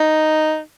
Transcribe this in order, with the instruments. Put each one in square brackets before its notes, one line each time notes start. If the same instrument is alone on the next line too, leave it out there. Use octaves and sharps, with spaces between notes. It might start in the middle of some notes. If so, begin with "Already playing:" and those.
Already playing: [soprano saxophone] D#4